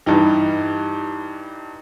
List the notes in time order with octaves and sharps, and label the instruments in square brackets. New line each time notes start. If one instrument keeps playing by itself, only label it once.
[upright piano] G2 E3 G3 [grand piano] D#4